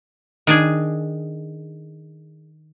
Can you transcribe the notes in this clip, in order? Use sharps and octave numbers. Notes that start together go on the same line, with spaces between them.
D#3 D4 G#4